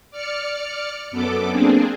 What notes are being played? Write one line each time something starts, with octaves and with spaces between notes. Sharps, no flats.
D5 F6 C#7
F#2 B3 A4 D6
A#3 C4 D4 G#4